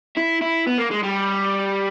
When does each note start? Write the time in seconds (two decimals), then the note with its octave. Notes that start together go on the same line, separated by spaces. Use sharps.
0.17 E4
0.42 E4
0.66 B3
0.78 A#3
0.91 G#3
1.03 G3